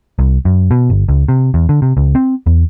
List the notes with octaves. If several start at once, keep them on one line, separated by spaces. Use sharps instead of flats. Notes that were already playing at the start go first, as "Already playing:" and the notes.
C2
F#2
B2
G1
C#2
C3
E2
D3
C3
C#2
C4
E2